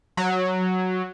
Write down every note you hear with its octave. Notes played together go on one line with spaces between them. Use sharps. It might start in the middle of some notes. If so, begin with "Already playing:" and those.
F#3